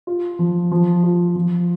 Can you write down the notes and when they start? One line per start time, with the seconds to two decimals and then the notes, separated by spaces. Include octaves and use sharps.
0.07 F4
0.39 F3
0.71 F3
1.03 F4
1.36 F3